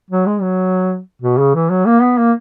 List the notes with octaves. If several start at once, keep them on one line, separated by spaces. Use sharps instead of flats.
F#3
G#3
F#3
B2
C#3
E3
F#3
A#3
B3
A#3